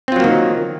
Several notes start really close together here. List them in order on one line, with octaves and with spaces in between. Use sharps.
C4 F4 F#3 A#3 D#3